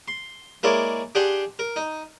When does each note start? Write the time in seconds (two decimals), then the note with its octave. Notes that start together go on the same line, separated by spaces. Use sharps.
0.08 C6
0.63 G#3 A#3 E4 A#4 C#5 D5
1.15 D4 G4 G#4 F#5 G5 C6
1.59 A#4
1.76 D#4